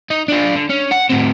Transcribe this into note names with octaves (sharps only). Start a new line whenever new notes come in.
D#4
D4 F4
D3
C#4
F#5
A2 C4